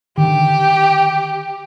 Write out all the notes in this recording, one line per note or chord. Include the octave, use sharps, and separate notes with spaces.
D3 D#3 G4